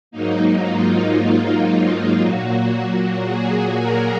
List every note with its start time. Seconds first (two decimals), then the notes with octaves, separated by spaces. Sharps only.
0.11 G#2 F#3 A#3 D#4
0.64 F4
1.17 D#4
1.68 F4
2.20 A#2 F#3 A#3 F#4
2.72 F#4
3.24 G#4
3.77 A#4